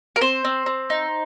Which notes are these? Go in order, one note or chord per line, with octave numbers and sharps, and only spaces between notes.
A#4
C4 C5
C4
C4
D#4